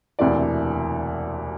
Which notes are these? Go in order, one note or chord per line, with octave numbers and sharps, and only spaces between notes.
E1 D2 C3 E3 D5